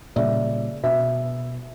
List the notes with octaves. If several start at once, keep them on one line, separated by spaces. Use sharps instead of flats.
A#2 C#3 G3 D5 E5
B2 E5